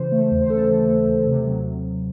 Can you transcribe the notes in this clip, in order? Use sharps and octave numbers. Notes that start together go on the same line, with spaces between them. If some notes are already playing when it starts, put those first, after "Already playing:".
Already playing: C#3 E3 C5
A3
D#2
C5
C#3 A4
E3
A3
D#2
C3
F#3